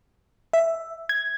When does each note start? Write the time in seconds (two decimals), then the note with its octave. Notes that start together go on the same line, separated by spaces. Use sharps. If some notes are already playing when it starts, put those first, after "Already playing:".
0.53 E5
1.09 G#6